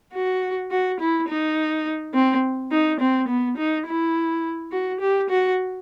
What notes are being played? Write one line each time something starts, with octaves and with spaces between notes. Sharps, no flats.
F#4
F#4
E4
D#4
C4
D#4
C4
B3
D#4
E4
F#4
G4
F#4